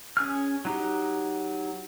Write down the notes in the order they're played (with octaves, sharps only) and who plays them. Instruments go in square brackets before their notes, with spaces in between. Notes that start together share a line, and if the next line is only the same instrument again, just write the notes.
[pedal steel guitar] C#4 G#4 F6
F#3 D#4 G4